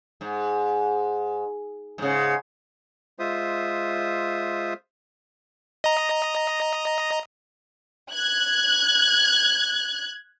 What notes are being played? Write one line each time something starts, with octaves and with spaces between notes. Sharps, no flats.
G#2
G#2 C#3
G#3 F4 C5 E5 D#6
D#5 A#5
F#6 G#6